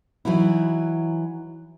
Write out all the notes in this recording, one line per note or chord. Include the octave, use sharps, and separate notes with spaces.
E3 F#3 D#4 E4